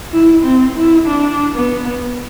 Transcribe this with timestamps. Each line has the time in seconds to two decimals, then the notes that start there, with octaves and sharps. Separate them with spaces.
0.12 E4
0.44 C4
0.75 E4
1.07 D4
1.55 B3